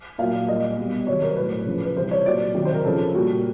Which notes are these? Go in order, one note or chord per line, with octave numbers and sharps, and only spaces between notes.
A#2 F#3 F5
A#2 G3 D#5
B2 G3
C3 D#3 F#3 C#5
A#4
C5
A2 F#3 B4
C#3 F3
B4
C3 E3 G3 C5
C#5
A#2 F#3 D5
C3 D#3 F#3
C5
A#4
C#3 F3 A4
A#2 G3 F#4